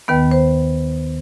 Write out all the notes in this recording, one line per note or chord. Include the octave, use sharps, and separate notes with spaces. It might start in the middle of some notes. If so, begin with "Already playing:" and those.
D#2 D#3 B3 B4
C5